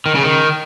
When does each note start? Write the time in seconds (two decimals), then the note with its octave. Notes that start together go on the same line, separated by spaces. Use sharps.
0.06 D#3
0.15 C#3
0.24 D#3